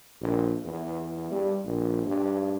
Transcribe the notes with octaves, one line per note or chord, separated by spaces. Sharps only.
A#1
E2
G3
A#1
G2